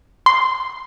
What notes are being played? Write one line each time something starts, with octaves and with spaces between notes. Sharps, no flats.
C6